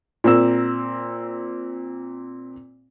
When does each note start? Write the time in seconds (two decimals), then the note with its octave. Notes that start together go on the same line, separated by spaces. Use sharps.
0.24 A#2 C4 E6